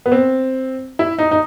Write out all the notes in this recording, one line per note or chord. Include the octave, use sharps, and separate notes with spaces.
B3
C4
E4
D#4
D#4